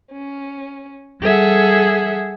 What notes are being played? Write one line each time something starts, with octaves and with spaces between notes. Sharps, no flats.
C#4
G3 G#4 A4 E5 F#5